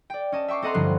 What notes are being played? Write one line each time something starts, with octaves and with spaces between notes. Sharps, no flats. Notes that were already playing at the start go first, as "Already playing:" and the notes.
D5 G5
C#4 D#5 A5
E5 G5 C#6 D6 C7
C4 A4 D#5 F#5 A#5 C6
C2 G2 D3 F3 F#6 C7